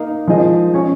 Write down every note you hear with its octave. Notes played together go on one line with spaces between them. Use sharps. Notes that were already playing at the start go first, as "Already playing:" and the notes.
Already playing: A#3 D#4 A#4 F5
F3 G#3 D#4 G#4 D#5
C#4 G#4 C#5